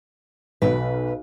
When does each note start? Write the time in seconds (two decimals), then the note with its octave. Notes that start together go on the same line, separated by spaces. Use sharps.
0.62 B1 B2 B4